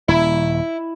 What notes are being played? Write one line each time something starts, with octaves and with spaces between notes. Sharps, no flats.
D#1 E4